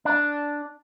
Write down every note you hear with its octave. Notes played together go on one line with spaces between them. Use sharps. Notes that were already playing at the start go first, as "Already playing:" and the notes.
D4